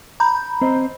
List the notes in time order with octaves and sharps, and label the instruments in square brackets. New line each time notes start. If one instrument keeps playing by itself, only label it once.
[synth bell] A#5 B5 G6
[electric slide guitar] C4 C5 D#5